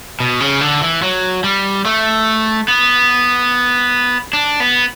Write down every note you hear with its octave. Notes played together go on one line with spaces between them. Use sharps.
B2
C#3
D3
E3
F#3
G3
A3
B3
D4
B3